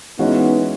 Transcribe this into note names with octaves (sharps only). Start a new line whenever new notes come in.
E3 G#3 B3 C#4 D#4 F#4